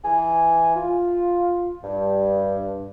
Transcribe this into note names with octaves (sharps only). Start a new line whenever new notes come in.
E3 G#5
F4
G2